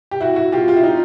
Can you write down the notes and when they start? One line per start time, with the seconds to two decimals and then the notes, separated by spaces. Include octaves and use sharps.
0.11 G4
0.21 E4 F#4
0.36 E4 F#4
0.52 F4 G4
0.68 F4 G4
0.76 E4
0.83 D#4 F4